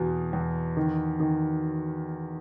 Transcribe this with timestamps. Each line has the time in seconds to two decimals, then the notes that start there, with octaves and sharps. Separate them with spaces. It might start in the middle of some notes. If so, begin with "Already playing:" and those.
Already playing: E2 B2
0.33 E2
0.77 D#3
1.20 D#3